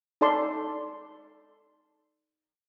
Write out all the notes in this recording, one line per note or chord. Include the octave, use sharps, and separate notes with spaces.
D#4 A4 D5 A5 C6